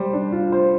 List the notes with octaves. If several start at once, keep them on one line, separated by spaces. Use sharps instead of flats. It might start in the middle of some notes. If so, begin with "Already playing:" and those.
Already playing: G3 C5
D4
F4
C5